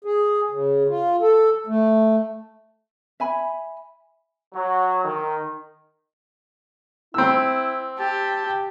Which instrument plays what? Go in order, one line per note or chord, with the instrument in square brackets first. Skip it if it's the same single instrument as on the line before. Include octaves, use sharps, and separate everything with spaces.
[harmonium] G#4
C#3
F4
A4
A3
[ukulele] E5 G#5 B5
[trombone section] F#3
D#3
[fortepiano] C4 E6 [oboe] E4
[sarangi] G4 [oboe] A5